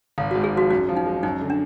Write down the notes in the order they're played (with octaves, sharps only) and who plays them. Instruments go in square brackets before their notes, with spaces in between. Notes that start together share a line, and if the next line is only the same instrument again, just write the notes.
[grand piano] G#1 [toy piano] F5
[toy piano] F#4
[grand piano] G#2
[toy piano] G#4
[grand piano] F3 [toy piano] F#4
[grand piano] F#2 [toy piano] F#4
[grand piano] F3
[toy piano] D#4
[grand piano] G#3
[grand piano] F#2 [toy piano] D#4
[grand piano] D3
[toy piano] D4